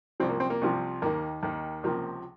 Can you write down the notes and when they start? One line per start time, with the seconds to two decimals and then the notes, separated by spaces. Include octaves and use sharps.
0.20 C2 C3 F3 C4
0.29 A#3
0.40 C4
0.50 A#3
0.61 C2 C3 F3
1.02 D#2 D#3 A#3
1.43 D#2 D#3
1.83 C#2 C3 F3 A#3